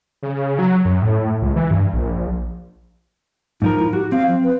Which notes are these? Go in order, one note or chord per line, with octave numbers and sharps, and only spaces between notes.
C#3
F#3
F#2
A2
C#2
E3
G2
A#1
G#2 F3 D#4 A#4
E4
F#4 G4
C4 F5
F3
B4